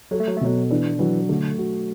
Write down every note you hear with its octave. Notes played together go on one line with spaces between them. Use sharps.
F#3 A4
A3
F#3
A3
B2 F#3
E3 D4
E3 F#3
D3 A3
F#4